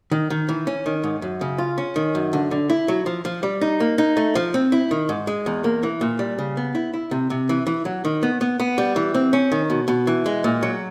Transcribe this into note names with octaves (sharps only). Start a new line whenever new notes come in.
D#3
D#3
E3
C#4
D#3
G#2
F#2
C#3
F4
C#4
D#3
F#2
D3
D3
E4
F#3
F3
F3
G3
D#4
A#3
D#4
A3
F3
C4
E4
D#3
G#2
G#3
E2
A#3
E3
A#2
G3
C#3
B3
E4
E4
C3
C3
E3
E3
F#3
D#3
B3
B3
B3
G3
E3
C4
C#4
D#3
B2
B2
E3
G#3
A#2
F#3